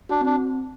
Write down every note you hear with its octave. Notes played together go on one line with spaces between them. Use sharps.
D4 F#4
C4 D4